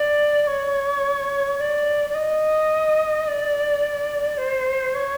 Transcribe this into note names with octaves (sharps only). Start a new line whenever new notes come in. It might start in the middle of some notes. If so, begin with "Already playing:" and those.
Already playing: D5
C#5
D5
D5
D#5
D5
C5
C#5